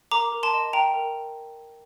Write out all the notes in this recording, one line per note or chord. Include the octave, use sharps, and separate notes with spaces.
A#4 A#5 D6
A#4
A5 C6
D#5
G5 A#5
A#4